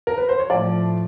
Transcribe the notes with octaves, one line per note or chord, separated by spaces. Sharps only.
A#4
B4
C5
C#5
A2 F3 A3 D5